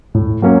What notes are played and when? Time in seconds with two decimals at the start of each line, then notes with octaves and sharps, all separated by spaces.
0.15 A2
0.42 F#3 A#3 C#4